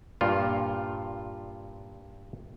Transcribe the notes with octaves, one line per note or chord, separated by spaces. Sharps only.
G2 A#2 F4